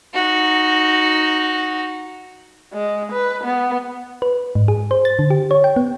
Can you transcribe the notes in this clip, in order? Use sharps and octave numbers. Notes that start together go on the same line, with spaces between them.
D#4 F#4
G#3
B4
B3
B4
G#2
G#4
C5
A6
D3
G4
C#5
G5
B3